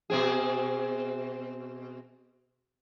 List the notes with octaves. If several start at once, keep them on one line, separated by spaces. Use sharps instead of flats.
B2 C4 G#4